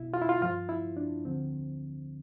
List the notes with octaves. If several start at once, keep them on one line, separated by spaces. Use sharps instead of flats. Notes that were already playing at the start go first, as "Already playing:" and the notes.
Already playing: C2 B2 E4
F4
E4
F4
G2 F3 F4
E4
D4
D2 D3 F3 C4